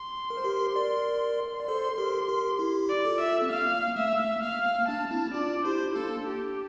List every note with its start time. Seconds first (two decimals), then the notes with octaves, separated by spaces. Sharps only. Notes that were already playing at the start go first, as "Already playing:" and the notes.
Already playing: C6
0.30 A#4
0.37 C5
0.44 G4 A#4
0.76 A#4 D5
1.60 D5
1.67 A4 C5 C6
1.98 G4 A#4
2.28 G4 A#4
2.59 E4 G4
2.89 D5
3.05 F4 A4
3.21 E5
3.42 C4
3.50 A#3 F5
3.74 A#3
3.96 A3 E5
4.20 A#3
4.42 A#3 F5
4.66 A#3
4.88 A#3 D4 A5
5.11 C4 E4
5.34 D4 F4 D5
5.65 E4 G4 C5
5.87 E4
5.95 A#3 D4 A4
6.27 G4